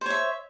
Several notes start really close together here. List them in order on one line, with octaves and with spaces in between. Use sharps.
C5 C#5 E5